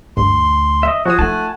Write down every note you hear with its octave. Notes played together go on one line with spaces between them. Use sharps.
D2 G2 C6
D#5 E5
F3 F#4 G#4 D#6
A3 D#4 F4 F#5 G#5 A5